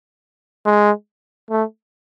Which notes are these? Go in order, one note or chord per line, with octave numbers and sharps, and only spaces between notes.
G#3
A3